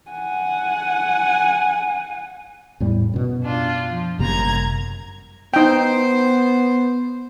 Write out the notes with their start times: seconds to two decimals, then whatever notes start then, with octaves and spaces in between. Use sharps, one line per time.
0.11 F#5 G#5
2.80 E2 A2 G3
3.14 F#2 B2
3.43 D4 F4
3.90 F3
4.19 G1 F#2 C3 A#3 A#5 G#6
5.54 B3 D#4 C5 G5